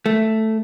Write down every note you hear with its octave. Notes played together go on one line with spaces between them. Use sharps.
A3